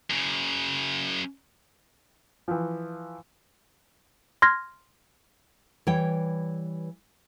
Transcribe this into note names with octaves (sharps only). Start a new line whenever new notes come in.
F#2 C#3
E3 F3
C6 F6 G#6 A#6
E3 G3 C#5 G5